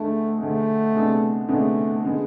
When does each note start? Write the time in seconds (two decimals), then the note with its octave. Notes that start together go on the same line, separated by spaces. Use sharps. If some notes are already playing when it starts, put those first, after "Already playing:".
Already playing: D2 D3 G#3 A3
0.38 D2 D3 G#3 A3
0.93 D2 C3 G#3 B3 D4
1.48 D2 C3 G#3 A3 B3 D4
2.05 D3 G#3 B3